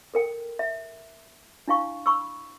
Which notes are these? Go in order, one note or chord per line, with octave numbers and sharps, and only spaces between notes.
A4 A#4 G5
E5
D4 E4 F5 C#6
B5 C#6 E6